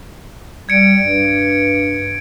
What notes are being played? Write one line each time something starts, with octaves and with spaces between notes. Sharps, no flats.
G3 G#6 C#7 D7
G2